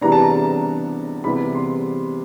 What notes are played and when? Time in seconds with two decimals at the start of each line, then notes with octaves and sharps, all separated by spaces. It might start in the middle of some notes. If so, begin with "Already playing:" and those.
0.01 C3 E3 G3 B3 D4 A#5
0.12 A5
0.22 A#5
1.24 C3 E3 G3 B3 B5
1.55 C6